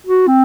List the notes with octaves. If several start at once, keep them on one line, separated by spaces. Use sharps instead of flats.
F#4
C4